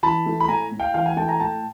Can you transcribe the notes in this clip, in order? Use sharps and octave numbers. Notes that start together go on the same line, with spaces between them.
E3 A5 B5
A3
B5
A2 G#5 A#5
A2
F5 G5
E3 F5 G5
F#5 G#5
A3 G5 A5
G#5 A#5
A2 G5 A5